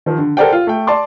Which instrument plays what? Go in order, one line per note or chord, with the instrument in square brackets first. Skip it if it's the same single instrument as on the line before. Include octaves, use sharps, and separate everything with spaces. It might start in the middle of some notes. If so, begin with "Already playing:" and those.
[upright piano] D#3 F3
D3
A4 A#4 C5 D5 F#5 G5
F4
A3 G5
D5 A5 C6 D6